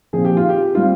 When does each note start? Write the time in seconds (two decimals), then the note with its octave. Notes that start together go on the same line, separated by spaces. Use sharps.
0.13 A#2 F3 C4 G#4
0.25 G4
0.37 F4
0.49 G4
0.75 G3 C4 F4